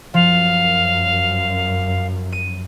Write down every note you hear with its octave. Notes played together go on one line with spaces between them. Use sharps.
F#2 F3 F5
D#7